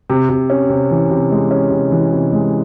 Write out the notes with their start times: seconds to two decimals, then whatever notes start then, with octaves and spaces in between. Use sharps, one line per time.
0.10 C3
0.29 C3
0.50 C#4
0.69 C3
0.91 E3
1.11 C3
1.31 G#3
1.51 C#4
1.71 C3
1.92 E3
2.12 C3
2.33 G#3